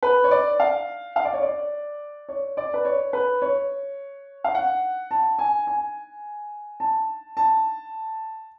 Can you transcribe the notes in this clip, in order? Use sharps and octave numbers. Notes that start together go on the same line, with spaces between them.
B4
C#5
D5
F5
F5
D5
C#5
D5
C#5
D5
B4
C#5
B4
C#5
F5
F#5
A5
G#5
G#5
A5
A5